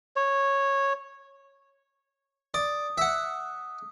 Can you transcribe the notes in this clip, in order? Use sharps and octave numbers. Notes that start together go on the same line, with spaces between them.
C#5
D5 D#6
E5 F#5